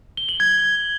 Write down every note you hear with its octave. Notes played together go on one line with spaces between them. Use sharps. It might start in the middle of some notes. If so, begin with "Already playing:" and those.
G7
F#7
G#6